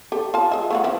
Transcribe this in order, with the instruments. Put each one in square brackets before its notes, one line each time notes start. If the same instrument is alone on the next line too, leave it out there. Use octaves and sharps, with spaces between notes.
[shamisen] G4 A4
F4 A5
G#3 E5
A3 F4 F#4
E3 F3 E4